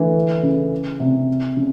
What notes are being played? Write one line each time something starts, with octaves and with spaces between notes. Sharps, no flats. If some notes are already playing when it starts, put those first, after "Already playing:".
Already playing: D3 E3
C#3
C3
C#3